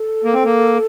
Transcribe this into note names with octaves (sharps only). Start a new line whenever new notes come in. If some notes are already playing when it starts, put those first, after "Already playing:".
Already playing: A4
A#3
C4
A#3